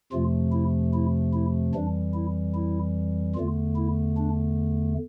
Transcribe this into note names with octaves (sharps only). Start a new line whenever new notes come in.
F2 C3 F3 A3 F4
E4
E4
E4
F2 E3 G3 D4
E4
E4
E2 D3 A3 F4
E4
D4